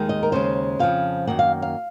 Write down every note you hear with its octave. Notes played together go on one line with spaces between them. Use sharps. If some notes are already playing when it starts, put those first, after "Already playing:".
Already playing: D#2 D#3 G#3
D#5
A#4
D#2 C#3 G#3 C5
F2 C#3 F3 F5
F#2 D#3 A#3 F#5
F5
F5